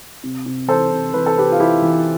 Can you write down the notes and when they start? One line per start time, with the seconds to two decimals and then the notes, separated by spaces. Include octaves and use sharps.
0.24 C3
0.46 C3
0.68 E3 A4 C5
0.92 C3
1.14 E3 B4
1.26 A4
1.37 C3 G4 B4
1.52 F4
1.60 E3 E4 G4
1.82 E3